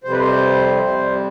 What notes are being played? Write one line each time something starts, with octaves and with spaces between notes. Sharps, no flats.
F2 C3 G3 C5
B4
C5
F2 C3 G3